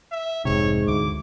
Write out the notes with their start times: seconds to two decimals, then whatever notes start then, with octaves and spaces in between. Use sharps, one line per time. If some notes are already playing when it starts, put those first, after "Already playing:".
0.12 E5
0.45 F1 G#2 C3 C#5
0.88 D2 D6